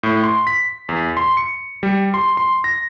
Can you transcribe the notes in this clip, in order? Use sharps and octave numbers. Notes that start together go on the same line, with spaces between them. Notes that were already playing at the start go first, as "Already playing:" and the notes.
A2
C6
B6
E2
C6
C#7
G3
C6
C6
A#6